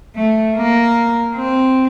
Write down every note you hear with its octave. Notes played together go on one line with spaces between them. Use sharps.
A3
A#3
C4